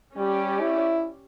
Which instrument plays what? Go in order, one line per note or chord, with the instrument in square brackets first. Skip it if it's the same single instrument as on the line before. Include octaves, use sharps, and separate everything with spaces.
[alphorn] G3 [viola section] C#4 G4 D5
[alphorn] E4